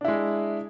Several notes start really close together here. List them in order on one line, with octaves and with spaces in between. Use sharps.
D4 E4 G#3